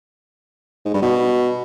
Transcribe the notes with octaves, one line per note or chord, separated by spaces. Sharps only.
G#2
G2
B2